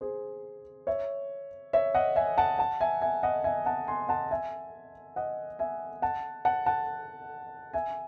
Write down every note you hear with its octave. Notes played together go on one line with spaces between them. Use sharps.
G#4 C5
C#5 E5
C#5 E5
D#5 F#5
E5 G#5
F#5 A5
F#5 A5
E5 G#5
E5 G#5
D#5 F#5
E5 G#5
F#5 A5
G#5 C6
F#5 A5
E5 G#5
D#5 F#5
E5 G#5
F#5 A5
F#5 A5
F#5 A5
E5 G#5